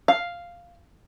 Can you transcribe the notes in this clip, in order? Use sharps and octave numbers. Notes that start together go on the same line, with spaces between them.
F5